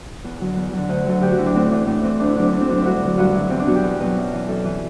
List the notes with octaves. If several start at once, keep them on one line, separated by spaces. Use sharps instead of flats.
E2
D3 F#3
E2
D3 F#3
D2
D3 F#3
D2 G4
F#4
D3 F#3 E4
D4
A2 C4
E3 D4
A2 D4
E3 C4
D2 D4
E4
D3 F#3 D4
C4
D2 D4
C4
D3 F#3 D4
C4
G2 E4 F#4
D3
F#3
G2 F#4
D3 F#3 E4
E2 C4
D4
B2 F#3 F#4
G4
E2
B2 F#3
F#2
E3
F#2 A4
E3